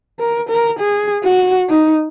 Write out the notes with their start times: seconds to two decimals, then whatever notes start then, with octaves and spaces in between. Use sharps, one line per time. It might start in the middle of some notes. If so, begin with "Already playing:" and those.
0.19 A#4
0.49 A#4
0.80 G#4
1.24 F#4
1.70 D#4